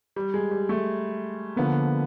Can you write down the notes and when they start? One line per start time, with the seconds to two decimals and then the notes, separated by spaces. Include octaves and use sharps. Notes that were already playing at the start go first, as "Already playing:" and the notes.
0.16 G3
0.34 G#3
0.51 G3
0.69 A3
1.56 D3 F3 A#3 B3